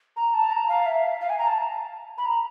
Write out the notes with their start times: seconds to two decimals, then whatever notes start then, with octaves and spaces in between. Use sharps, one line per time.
0.17 A#5
0.34 A5
0.51 A#5
0.69 F5
0.86 E5
1.03 F5
1.21 F5
1.30 G#5
1.39 A#5
1.47 A5
2.18 B5
2.25 A#5